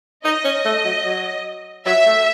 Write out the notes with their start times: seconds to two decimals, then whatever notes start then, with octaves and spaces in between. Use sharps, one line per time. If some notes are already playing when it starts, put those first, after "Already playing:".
0.25 D#4 D#5
0.45 C#4
0.65 A3
0.85 F#3
1.05 F#3
1.86 F#3 E5
2.06 A3